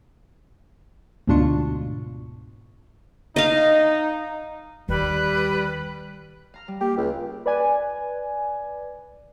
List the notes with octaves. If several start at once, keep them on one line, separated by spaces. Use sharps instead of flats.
D2 G#2 B2 D4 F4 C#6
D#4 D#5 F5
D#2 D3 G3 B4
F5 A#5 F6
G3
A#3 G4
C#2
B4 D5 G#5